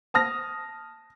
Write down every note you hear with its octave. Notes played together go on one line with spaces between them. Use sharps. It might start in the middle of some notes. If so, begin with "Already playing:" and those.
A5 D#6 F6 A#6